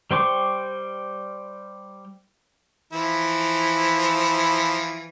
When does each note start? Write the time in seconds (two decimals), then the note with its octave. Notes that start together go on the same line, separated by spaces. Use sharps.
0.11 G3 C5 G5 C#6 D6
2.93 E3 F3 E4